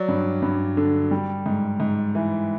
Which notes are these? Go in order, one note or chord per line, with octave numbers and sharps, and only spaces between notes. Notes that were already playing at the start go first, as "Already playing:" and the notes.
Already playing: F#3 D5
G2
G2
D3
G3
G#2
G#2
E3